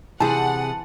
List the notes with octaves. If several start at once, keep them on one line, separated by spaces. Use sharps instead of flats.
C3 E3 G#4 C5 F#5 A5